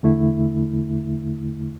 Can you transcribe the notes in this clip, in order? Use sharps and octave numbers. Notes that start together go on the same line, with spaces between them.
E2 D3 A3 E4